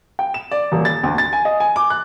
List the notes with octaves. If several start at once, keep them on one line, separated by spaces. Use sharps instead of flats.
G5
E7
D5
D#1
A6
D2
A6
G#5
D#5
G#5
D6
F#6